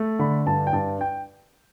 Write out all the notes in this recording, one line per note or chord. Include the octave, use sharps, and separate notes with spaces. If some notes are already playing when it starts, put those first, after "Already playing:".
Already playing: A3
D3 B5
G2 A5
G5
G2 A5
G5